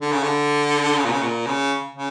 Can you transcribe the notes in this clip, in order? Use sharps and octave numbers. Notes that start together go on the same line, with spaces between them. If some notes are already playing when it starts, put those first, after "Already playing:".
D3
C#3
D3
C#3
A#2
C#3
A#2
C#3
C#3